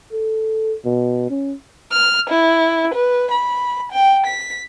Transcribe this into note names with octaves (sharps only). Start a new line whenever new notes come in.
A4
B2
C#4
F6
E4
B4
B5
G5
B6